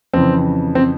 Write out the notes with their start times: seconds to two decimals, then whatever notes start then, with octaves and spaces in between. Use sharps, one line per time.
0.14 F2 C#3 E3 C4
0.75 C4